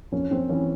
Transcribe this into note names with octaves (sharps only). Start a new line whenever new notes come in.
F2 C#4
F2 C4
E3 C#4